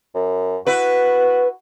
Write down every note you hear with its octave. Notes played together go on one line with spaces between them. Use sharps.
F#2
E4 F#4 B4